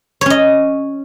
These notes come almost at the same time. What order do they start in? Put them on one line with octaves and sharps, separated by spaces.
C#5 C#4 D#5